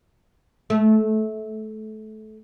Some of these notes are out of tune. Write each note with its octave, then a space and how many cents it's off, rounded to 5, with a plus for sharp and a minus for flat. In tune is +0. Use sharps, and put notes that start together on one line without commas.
A3 -25